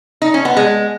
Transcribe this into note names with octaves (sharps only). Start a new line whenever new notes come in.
D#4
C#4
B3
G#3